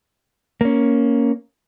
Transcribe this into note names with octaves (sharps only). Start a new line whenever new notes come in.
A#3 C#4